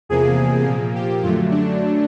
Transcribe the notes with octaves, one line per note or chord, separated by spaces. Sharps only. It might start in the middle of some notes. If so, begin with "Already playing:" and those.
E2 C3 F3 A#3 G#4
A#2 F3 A#3
G4
F#2 D3 F#3 A3 F4
D4